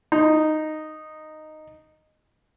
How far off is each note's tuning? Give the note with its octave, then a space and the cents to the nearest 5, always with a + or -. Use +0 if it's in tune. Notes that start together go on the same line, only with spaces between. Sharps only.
D#4 -5